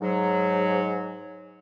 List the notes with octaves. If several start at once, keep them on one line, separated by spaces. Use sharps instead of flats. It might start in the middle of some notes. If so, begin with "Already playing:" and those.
G#2 F#3